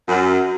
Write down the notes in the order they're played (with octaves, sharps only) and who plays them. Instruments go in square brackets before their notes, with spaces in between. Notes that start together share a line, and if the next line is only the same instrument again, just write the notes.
[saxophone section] F#2